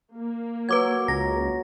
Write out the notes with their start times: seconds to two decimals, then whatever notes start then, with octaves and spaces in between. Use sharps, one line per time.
0.15 A#3
0.69 F#3 B4 D6 G#6
1.08 C#2 A#5 A#6